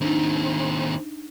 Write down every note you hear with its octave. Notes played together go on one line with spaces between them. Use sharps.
D#2 C4 D4 D#4